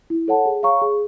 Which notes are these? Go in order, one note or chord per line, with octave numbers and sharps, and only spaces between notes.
E4
A4 C#5 F#5 A5
G#4
C#5 F5 A#5 C#6
G#4